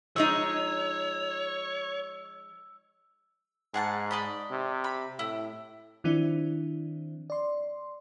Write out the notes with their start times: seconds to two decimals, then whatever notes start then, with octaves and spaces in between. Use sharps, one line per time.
0.16 F3 G#3 D#4 C#5 E6
3.74 G#2 G#4 F#5 A5
4.11 D5 D#5 B5
4.51 C3
4.84 B5
5.19 A2 E4
6.04 D#3 F3 C4 D4 E4
7.30 D5 C6